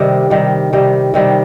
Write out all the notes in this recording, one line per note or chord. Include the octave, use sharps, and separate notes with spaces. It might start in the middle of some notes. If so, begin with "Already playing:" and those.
Already playing: C3 D#3 G3
C3 D#3 G3
C3 D#3 G3
C3 D#3 G3